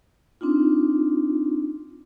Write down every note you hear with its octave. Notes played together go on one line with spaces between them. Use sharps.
C4 D4 D#4 F4